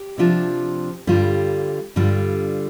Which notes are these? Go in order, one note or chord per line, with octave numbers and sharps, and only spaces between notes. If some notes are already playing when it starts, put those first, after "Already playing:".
Already playing: G4
C3 F3 D4 F4
G2 D3 G3 F4
G2 D3 G3 F4